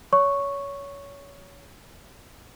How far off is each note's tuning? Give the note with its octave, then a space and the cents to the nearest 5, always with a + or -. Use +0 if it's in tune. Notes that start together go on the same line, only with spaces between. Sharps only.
C#5 +25 C#6 +0